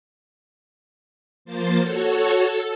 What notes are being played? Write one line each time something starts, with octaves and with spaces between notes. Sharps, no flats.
F3 A#3 C5 A6
F#4 A4 C#5
A4 E6